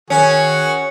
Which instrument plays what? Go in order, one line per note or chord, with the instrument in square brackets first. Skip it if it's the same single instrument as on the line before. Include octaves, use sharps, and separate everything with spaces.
[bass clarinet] D#3 [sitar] C#4 [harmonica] F#4 G#4